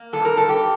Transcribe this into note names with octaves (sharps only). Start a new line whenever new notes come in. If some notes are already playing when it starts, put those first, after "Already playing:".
Already playing: A#3
G2 A4
A#4
G2 A4
G4